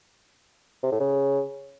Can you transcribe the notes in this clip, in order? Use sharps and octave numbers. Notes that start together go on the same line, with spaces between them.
C3
A2
C#3